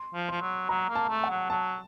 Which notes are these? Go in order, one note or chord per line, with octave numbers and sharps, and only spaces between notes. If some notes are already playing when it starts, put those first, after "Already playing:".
Already playing: C6
F3
F3 C6
F#3
F#3 A#5
A#3
A5
A3
F#5
F#3
F#3 A5